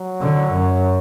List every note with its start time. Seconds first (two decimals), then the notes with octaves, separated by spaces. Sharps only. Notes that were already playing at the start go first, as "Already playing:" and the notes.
Already playing: F#3
0.20 D3
0.52 F#2